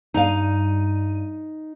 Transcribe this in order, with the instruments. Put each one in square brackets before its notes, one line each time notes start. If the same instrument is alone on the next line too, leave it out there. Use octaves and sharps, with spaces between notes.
[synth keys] G2 D#7 [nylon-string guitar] D#4 F5